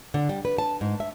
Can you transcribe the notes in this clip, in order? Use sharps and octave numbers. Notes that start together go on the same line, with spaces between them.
D3
G3
B4
A5
G#2
E5